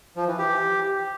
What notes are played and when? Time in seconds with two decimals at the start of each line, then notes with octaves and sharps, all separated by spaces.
0.16 F3
0.27 E3
0.39 G4